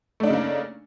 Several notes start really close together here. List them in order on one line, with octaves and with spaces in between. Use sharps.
A3 D4 D#4 C#3 A#3